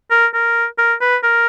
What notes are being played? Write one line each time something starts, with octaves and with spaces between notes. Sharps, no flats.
A#4
A#4
A#4
B4
A#4